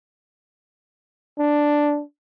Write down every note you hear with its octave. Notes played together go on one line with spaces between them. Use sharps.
D4